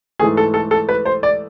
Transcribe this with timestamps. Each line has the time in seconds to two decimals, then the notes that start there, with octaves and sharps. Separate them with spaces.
0.19 G#2 E3 A3 G#4
0.37 A4
0.54 A4
0.71 A4
0.89 B4
1.05 C5
1.23 D5